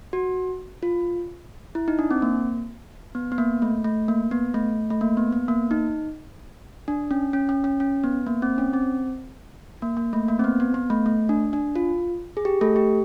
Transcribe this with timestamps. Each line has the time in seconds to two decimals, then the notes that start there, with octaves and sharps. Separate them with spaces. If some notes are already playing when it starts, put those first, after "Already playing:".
0.13 F#4
0.83 F4
1.75 E4
1.88 D#4
1.99 D4
2.11 C4
2.22 A#3
3.15 B3
3.32 B3
3.38 A#3
3.62 A3
3.84 A3
4.08 A#3
4.31 B3
4.54 A3
4.90 A3
5.01 A#3
5.17 B3
5.32 B3
5.48 A#3
5.71 D#4
6.88 D4
7.11 C#4
7.33 C#4
7.49 C#4
7.64 C#4
7.80 C#4
8.04 B3
8.27 A#3
8.42 C4
8.58 C#4
8.73 C4
9.82 A#3
9.97 A#3
10.13 A3
10.28 A#3
10.39 C4
10.44 B3
10.60 B3
10.74 B3
10.90 A3
11.06 A3
11.29 D4
11.53 D4
11.76 F4
12.37 G#4
12.45 G4
12.61 A3 A4
12.76 G4